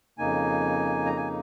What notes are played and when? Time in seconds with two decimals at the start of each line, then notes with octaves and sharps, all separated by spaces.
0.18 F2 C#3 A#3 D#4 G#5
1.05 A#5
1.17 G#5